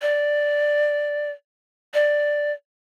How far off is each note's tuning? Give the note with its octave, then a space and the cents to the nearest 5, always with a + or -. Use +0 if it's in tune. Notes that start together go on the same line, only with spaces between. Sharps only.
D5 +0
D5 +5